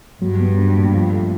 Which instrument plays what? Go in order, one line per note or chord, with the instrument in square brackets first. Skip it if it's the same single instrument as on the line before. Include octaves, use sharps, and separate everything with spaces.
[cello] G2 [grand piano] F#3
[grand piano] B3
D4
A#2
F3
A3